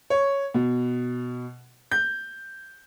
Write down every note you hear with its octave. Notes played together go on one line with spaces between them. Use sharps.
C#5
B2
G6